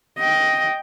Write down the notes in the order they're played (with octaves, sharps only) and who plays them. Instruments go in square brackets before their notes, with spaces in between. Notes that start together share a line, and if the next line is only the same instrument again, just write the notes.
[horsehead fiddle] D#5 G5